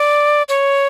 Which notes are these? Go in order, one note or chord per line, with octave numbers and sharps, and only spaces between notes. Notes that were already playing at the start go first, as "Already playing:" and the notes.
Already playing: D5
C#5